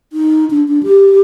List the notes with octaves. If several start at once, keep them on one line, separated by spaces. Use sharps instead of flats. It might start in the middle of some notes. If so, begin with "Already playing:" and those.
D#4
D4
D4
G4